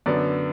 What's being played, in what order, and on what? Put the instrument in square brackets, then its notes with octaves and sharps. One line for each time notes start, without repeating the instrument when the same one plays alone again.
[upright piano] F#2 D3 B3 D5